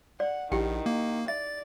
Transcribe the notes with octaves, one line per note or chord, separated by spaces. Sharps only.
D5 F#5
A#1 D#3 E4 G4 G5
A#3
D5 E5 A6